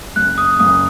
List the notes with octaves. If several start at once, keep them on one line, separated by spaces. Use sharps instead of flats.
F#1 F#6
D#6
F#1 D#6